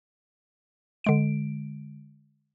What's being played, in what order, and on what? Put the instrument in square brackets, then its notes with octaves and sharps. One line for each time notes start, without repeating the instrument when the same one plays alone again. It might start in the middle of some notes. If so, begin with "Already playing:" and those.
[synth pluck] D3 G#3 D7